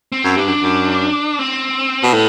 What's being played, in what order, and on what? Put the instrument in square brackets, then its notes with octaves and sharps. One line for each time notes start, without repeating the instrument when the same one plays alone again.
[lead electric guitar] C4
[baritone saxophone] F#2
[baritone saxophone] G2 [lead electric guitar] D4
[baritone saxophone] F#2
F#2
[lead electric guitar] C4
[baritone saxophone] B2
[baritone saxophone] A2 [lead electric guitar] B3